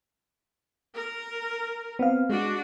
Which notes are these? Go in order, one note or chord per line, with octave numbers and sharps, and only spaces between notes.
A#4
B3 C4 F5
G#3 D4 F#4